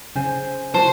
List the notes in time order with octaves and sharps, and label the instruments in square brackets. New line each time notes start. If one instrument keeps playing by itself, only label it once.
[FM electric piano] C#3 [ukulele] C5 G#5
[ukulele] F#4 B4 A5 [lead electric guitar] C5